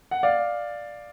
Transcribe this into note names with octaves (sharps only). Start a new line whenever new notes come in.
F#5
D5 F5